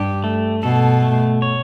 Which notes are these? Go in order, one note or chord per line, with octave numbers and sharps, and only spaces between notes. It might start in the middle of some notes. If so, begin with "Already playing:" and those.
Already playing: G2 G4
A3
B2 A4
A3
C#5